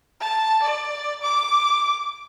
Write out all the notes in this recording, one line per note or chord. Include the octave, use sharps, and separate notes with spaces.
A5
D5
D6